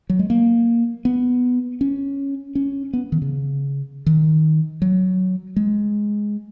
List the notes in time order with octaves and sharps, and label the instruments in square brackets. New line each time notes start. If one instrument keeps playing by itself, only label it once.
[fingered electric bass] F#3
G#3
A#3
B3
C#4
C#4
B3
D#3
C#3
D#3
F#3
G#3